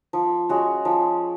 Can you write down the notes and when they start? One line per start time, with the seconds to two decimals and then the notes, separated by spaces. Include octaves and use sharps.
0.13 F3
0.49 G#3 C#4 F#4
0.85 F3